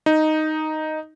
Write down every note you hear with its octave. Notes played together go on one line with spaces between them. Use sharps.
D#4